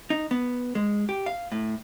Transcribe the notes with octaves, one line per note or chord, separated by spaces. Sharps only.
D#4
B3
G#3
G4
F5
A2